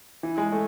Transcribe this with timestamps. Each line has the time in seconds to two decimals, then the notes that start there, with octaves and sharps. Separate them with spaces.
0.23 E3
0.38 G#3
0.52 A3